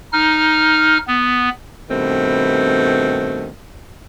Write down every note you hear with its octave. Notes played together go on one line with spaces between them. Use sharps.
D#4 F6
B3
G2 B2 D#3 A3 C4